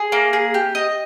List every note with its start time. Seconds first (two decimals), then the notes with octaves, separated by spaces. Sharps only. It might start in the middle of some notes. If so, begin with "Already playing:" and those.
Already playing: G#4
0.12 A#3
0.33 G#4
0.54 G4
0.75 D#5